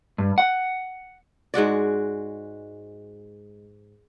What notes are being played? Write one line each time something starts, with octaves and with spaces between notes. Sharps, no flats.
G2
F#5
G#2 G#3 F#4 D5